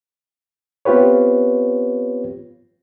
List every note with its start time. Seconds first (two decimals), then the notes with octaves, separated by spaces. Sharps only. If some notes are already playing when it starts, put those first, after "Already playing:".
0.85 B3 C4 F4 G4 B4 C#5